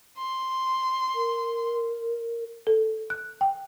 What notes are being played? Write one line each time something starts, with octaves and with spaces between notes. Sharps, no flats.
C6
A#4
A4
F#6
G5